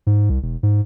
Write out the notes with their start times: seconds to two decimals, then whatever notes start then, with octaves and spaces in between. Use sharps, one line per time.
0.07 G#2
0.30 C2
0.42 E1
0.63 G#2